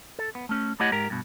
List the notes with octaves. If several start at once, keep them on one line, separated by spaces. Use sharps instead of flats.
A4
B3
A3 C#4
A3 E4 G4 C#5 D#5 F#5
G#2 G4 A#4
G2 B2